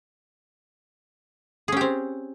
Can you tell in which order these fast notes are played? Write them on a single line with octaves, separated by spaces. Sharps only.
G#4 C#4 G4 C4